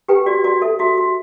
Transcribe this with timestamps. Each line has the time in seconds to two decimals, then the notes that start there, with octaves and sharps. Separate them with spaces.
0.08 G4 B4 G5
0.26 F#4 D5
0.44 F#4 D5
0.62 A4 E5
0.79 F#4 E5
0.98 F#4